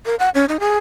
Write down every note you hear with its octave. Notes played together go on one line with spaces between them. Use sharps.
A#4
F#5
C#4
D#4
G#4